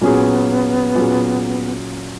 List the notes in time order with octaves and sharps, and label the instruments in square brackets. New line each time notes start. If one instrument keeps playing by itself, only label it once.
[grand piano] A#2 F#3 C#4 G#4 [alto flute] B3
[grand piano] A#2 F#3 C#4 G#4